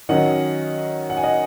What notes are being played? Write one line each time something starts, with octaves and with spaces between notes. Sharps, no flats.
D#3 F#3 C#4 D#5 F#5
F#5
G#5
D#5 F#5